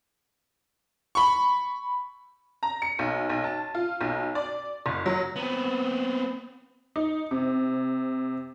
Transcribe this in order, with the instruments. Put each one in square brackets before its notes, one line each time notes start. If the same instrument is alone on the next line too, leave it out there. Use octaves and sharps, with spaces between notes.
[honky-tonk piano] B5 C#6
A#5
C#7
B1
B1
A5
F4
B1
D5
F#1
F#3
[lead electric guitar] B3 C4
[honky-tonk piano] D#4
C3